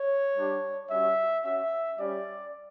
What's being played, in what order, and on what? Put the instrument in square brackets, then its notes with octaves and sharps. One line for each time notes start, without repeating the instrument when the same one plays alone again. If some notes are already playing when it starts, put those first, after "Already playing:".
Already playing: [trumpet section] C#5
G3 D4 G4
G3 C#4 F#4 E5
C#4 F#4 E5
G3 C#4 G4 D5